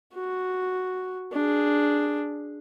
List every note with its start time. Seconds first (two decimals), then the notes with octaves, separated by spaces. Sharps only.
0.14 F#4
1.33 D4 G#4